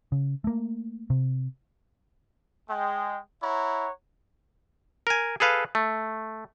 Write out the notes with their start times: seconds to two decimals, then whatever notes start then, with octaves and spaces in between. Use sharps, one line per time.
0.12 C#3
0.44 A3 A#3
1.10 C3
2.70 G#3 G5
3.42 E4 C#5 F#5 A#5
5.07 A#4 G#5
5.40 G#4 A4 B4 F5
5.75 A3